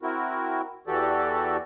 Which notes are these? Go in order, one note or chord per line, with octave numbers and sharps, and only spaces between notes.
C4 E4 F#4 A#4
E2 E3 F#4 G4 A4 D5